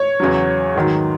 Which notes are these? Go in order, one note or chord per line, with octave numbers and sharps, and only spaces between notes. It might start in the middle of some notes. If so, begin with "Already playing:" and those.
Already playing: C#5
E2 C#3 F#3
G#2 D#3 F#3